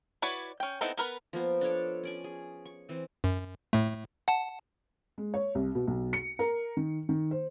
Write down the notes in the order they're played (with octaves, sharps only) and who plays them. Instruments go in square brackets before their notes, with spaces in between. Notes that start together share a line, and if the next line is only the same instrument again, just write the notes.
[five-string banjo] E4 F#4 B4 C#5 D5
C#4 G5
B3 C4 D#4 E4 A4
B3 A#4 B4
[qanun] F3 A#3 B3
D4 A4 C#5 D6
C#4 D5 G#5
G#4
C#6
E3 C4
[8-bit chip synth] F#2
A2 A3
F#5 A5
[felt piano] G#3
C#5
C2
B2
B1
C#7
A#4
D#3
D#3
C5